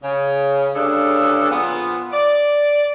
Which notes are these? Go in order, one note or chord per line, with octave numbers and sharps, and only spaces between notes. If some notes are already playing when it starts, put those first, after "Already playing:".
C#3
D2 G2 C#3 D4 A4
A#2 F3 B3
D5